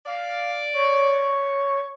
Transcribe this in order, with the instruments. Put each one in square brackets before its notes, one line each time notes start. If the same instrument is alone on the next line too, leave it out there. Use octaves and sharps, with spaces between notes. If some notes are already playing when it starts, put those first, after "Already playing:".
[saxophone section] D5 [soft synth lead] F5
[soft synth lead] C#5